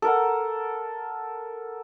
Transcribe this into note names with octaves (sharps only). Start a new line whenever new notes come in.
A4 A#4 F#5